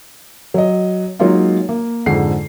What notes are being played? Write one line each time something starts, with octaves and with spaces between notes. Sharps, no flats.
F#3 D#5
F#3 G#3 A#3 D#4 F4
A#3
F2 G#2 D3 G#3 C7